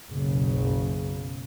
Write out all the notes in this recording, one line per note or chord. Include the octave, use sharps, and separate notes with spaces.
F#1 B1 C#3